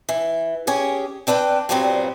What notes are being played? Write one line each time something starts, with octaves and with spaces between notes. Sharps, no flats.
E3
C#4 G4 G#4
C4 D4 B4 F5 G5
G2 A#2 F#3 G3 B3 C4